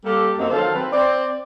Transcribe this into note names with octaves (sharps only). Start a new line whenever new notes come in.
G3 A#3 G4 A4
F#2 F#3 A#3 C4 D#4
D#3 F3 F#3 A4 C5 F5
C4 B4
C4 D5